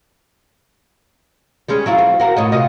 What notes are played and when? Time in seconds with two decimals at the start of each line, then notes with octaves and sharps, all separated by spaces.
1.68 G3 G#3 C#4
1.86 F#3 E4 F4
1.98 C4
2.20 F#4 A#4
2.36 A2 C#5 D#5
2.52 C3 F4 D#5